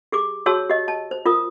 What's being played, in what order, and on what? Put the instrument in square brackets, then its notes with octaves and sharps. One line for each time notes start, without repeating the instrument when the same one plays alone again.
[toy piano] G4 G#4 D6
F#4 G#4 C#5 A5 E6
G4 D#5
A5
C5
F4 A#4 D#6